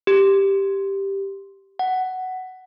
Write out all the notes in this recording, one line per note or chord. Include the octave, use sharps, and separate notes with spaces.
G4
F#5